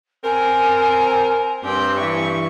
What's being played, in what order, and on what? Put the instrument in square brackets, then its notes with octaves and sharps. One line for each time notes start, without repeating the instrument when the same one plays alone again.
[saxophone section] C4 A#4 [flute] G#5
[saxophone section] G2 [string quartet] C4 G4
[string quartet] E3 C#6 [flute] E5